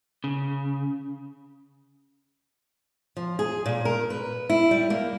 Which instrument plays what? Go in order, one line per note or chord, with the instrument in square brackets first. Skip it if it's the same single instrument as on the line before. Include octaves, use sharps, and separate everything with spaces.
[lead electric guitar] C#3
[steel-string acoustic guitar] F3
G#4
A#2
A#4
B4
E4
G3
A#3